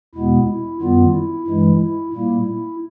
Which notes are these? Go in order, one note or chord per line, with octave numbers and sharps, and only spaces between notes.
E2 B2 G#3 B3 E4
E4
F#2 D#3 G3 B3 F4
E4
G2 E3 G#3 E4
E4
A#2 G3 A#3 E4
E4